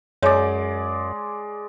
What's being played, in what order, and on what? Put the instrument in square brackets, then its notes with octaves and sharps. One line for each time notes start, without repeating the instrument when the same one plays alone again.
[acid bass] F#2 [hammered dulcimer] G#3 D5 [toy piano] C#5